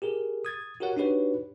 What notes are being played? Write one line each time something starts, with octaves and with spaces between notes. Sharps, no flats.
G4 G#4 A#4
D#6 G#6 A6
F#4 G4 A#4 C#5 F#5
D4 D#4 F#4 G4 B4 C#5